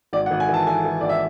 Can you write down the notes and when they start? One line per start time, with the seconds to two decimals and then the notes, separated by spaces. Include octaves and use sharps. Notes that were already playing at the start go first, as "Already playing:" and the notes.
0.13 G#1 D5
0.26 F#5
0.31 G#1
0.40 G#5
0.48 E3
0.54 A5
0.67 E3 G#5
0.85 E3
1.01 G#1 D5
1.09 E5